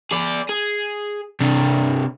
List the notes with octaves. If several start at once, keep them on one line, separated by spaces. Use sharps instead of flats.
G#4 D5
G#4
C3 D4